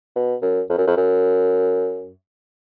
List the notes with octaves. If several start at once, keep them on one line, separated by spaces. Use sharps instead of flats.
B2
F#2
F2
F#2
F2
F#2